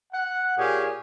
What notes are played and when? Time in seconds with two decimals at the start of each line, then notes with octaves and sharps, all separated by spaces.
0.13 F#5
0.58 A#2 G4 G#4 C#5 F5 G#5